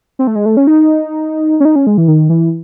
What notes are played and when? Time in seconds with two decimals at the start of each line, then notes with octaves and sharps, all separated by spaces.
0.19 C4
0.27 A3
0.35 G#3
0.46 A3
0.57 C#4
0.67 D#4
1.60 C#4
1.65 D#4
1.76 C#4
1.87 G#3
1.98 E3
2.08 D#3
2.29 E3